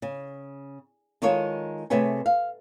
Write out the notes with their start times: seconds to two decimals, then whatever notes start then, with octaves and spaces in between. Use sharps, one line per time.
0.02 C#3
1.22 D#3 G#3 F4 A4 C#5
1.90 C3 A3 G#4 B4 C#5 G#5
2.26 F5